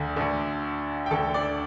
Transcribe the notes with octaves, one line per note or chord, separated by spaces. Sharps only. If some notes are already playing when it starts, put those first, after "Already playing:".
Already playing: D2 D3
D2 D3
G5
D2 D3 A4 A5
D4 D5